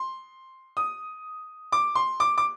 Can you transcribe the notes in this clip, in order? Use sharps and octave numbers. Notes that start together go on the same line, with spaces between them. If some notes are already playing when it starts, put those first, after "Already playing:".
Already playing: C6
D#6
D6
C6
D6
D6